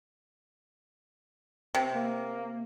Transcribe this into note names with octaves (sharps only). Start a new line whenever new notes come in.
C3
A#3